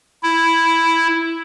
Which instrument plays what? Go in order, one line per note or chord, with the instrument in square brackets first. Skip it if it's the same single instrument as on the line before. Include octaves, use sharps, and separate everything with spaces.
[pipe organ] E4